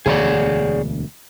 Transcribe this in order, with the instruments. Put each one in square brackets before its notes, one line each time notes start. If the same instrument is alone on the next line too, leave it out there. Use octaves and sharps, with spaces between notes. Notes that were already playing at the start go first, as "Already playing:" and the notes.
[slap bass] E1 D2 [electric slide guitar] G#4 C#5 D5